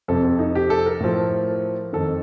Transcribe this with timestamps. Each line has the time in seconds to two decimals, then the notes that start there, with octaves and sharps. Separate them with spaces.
0.08 F2 C3 F3 A4
0.25 A4
0.39 D#4
0.55 G4
0.70 A4
0.86 A#4
1.00 A2 F3
1.93 F2 D#3 A4